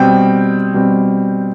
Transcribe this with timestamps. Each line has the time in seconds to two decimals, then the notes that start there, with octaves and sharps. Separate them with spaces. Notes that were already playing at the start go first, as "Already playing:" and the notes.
Already playing: B2 G3 C4 G5
0.74 B2 G3 C4